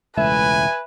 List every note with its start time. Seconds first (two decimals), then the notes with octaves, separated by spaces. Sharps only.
0.17 E1 C#2 A2 B4 E5 G#5